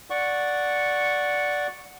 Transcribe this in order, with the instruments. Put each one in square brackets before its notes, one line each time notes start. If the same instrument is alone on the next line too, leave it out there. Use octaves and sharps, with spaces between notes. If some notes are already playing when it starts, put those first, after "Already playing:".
[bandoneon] D5 F#5 C#6